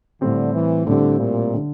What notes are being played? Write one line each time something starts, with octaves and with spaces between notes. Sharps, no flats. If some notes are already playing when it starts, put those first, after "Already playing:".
A2 D3 G3 C4 G4
E3
A2 D3 G3 C4 G4
A#2
D3